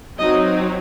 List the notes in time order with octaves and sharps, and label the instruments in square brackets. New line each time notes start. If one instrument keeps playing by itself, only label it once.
[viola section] F#3 C4 D#4 D#5